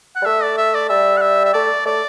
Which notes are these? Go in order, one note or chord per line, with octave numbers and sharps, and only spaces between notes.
F#5
G3
A3 E5
D5
E5
D5
G3 E5
F#5
E5
E5
A3 D5
A3 D5